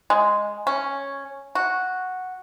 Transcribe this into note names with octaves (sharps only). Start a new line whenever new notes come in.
G#3
C#4
F#4